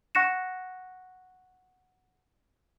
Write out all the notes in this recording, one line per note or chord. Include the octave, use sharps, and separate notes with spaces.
F#5 C#6 F#6 A#6 C#7 E7